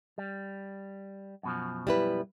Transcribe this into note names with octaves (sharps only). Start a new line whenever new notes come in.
G3
F#2 B2 F3
G3 E4 B4